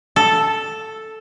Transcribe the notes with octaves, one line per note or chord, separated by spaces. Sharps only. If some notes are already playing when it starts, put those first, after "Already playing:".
A4